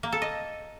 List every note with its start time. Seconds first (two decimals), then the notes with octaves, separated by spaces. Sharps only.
0.03 A#3
0.12 A4
0.22 D#5